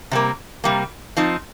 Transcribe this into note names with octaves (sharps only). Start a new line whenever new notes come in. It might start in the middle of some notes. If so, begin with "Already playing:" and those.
C3 G3 A#3
C3 G3 A#3
F3 C4 D#4